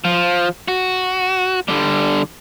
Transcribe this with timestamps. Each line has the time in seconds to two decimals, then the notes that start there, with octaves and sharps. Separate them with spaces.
0.05 F3
0.68 F#4
1.68 D3 G3